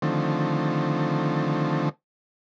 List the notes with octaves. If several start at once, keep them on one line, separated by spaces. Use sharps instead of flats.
D3 D#3 F3 A3 C4